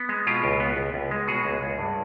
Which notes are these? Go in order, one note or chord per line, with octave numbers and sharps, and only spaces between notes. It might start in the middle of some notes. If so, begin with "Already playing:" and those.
Already playing: B3
G#3
B2 F4 G4
C#2
B3
C#2
C#2
G#3
B2 F#4 G#4
C#2
C#2
G2